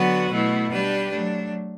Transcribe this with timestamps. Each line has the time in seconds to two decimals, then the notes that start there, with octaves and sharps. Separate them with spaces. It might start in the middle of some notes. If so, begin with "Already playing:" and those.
Already playing: D3 F#3 B3 F#4 B4
0.31 B2 A3 E4
0.71 G3 D4 G4 B4
1.10 F#3 A3 D4